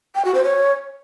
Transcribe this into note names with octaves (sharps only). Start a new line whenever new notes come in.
G5
F#4
C5
C#5